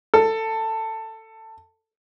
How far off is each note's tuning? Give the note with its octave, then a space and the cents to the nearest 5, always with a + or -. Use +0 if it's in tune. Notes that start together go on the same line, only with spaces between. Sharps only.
A4 +15